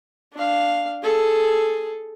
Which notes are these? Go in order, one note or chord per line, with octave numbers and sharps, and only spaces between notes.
D4 F5
G#4 A4